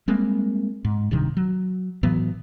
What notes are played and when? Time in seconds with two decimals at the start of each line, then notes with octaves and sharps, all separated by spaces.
0.08 G3 G#3 A#3 C4
0.85 G#2
1.11 D1 G2 C3 D#3
1.37 F#3
2.03 A2 E3 F#3 B3